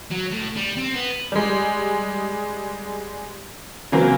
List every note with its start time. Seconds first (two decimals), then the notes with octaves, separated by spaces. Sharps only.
0.11 F#3
0.32 A2
0.57 G3
0.77 C4
0.94 B3
1.32 G3 G#3
3.92 C#3 E3 F#3 A#3 C4